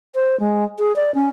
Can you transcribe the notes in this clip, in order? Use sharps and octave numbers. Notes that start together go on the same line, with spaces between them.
C5
G#3
G#4
D5
C#4